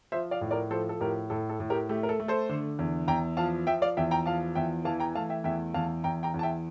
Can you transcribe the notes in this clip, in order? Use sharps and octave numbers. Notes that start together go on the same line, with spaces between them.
F3 C5 E5
D5 F5
A2
A#4 D5
F3 A4 C5
A4
A2 G4 A#4
A2 A4
A4
A2
G4 A#4
A3 G4
A#4
A4
A3
A4 C5
D3
E2
E2 G5 A#5
F3 F5 A5
F3 E5 G5
D5 F5
E2 E5 G5
G5 A#5
F3 F5 A5
E2 E5 G5
E3 F5 A5
G5 A#5
A3 F5 A5
E5 G5
E2 E5 G5
E2 F5 A5
E2 G5 A#5
G5 A#5
E2
A5
E5 G5